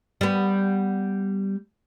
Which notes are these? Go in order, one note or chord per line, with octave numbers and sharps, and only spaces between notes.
G3 B3